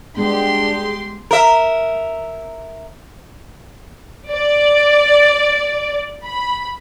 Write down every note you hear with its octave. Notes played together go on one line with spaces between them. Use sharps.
G3 G#3 B3 D4 G4 G#4 C6
A#4 E5
D5
B5